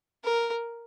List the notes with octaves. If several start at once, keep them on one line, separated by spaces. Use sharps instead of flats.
A#4